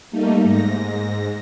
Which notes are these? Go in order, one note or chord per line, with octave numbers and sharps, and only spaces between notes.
G3 A3 A#3 D#4
G#2 A#6